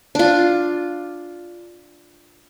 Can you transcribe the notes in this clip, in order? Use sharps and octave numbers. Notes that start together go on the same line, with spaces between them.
D4 F4